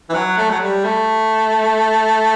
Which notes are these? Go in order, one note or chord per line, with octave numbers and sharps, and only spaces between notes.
E3
F#3
A3
F#3
G3
A3